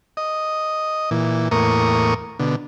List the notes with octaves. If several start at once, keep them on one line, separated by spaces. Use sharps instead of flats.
D#5
A#2 E3
E2 A2 A#3 A#4 C#6 D#6
B2 D3